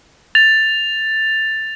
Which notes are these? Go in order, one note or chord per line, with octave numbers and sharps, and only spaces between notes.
A6 F7